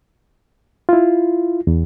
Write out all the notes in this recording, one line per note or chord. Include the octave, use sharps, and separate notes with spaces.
E4 F4
E2